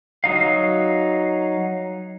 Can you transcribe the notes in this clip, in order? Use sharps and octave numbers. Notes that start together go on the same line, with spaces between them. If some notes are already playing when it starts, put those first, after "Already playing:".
F#3 D#4 F5